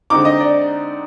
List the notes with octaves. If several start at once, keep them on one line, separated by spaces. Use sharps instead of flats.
D3 G#3 C4 D#4 D6
D#5
D5